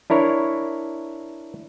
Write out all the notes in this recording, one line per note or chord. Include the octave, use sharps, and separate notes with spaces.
D4 E4 A#4 C#5